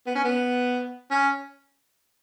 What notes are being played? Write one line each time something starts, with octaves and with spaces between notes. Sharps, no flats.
B3
C#4
B3
C#4